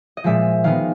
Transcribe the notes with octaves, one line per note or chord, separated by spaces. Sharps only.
D#5
A#2 F3 G#3 E5
D#3 G#3 B3 F5